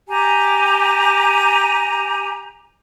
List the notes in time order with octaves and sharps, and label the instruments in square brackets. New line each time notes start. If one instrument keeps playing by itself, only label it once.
[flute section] G4 G#5 A#5